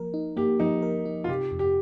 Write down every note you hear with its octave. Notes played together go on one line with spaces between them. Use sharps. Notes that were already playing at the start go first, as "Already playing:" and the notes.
Already playing: F3 A#3 A#4
D#4
A#3 G4
F3 D#4
A#4
D#4
F4
C3 G4
F2
G4